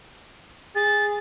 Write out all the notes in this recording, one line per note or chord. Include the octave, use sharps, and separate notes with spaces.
G#4 A6